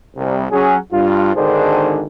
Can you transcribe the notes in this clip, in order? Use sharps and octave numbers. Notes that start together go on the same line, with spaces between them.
C2
F#3 C#4 G#4
G2 F4
G#1 D3 D#3 D4 G#4 C5